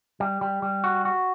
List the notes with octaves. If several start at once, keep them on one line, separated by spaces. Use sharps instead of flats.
G3
G3
G3
F#4
F#4